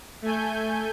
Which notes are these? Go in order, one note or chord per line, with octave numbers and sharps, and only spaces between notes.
A3 G#5 G6